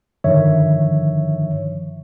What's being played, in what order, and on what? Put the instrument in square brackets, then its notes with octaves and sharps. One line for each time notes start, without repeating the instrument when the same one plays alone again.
[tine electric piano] G2 D3 D#3 F3 C#5 E5